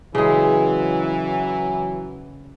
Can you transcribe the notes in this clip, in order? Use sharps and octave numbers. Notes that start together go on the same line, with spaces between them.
C#3 E3 F#3 G#3